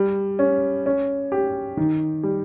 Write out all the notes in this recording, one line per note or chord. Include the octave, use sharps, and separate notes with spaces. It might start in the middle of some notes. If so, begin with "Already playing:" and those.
Already playing: G3
C#4
C#4
G4
D#3
G3